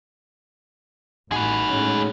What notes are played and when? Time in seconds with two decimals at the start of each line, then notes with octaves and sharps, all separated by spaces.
1.32 A1 D#4 F#4 G#4 B4
1.67 A2 G#3 C#4